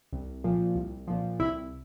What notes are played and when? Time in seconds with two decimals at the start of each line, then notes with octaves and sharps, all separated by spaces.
0.13 C2
0.44 A#2 F3
0.75 C2
1.07 A#2 F3
1.40 C2 E4